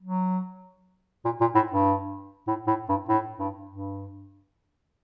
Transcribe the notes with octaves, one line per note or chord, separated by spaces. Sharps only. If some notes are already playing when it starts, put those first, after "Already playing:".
F#3
A#2
A#2
A2
G2
A2
A2
G2
A2
G2
G2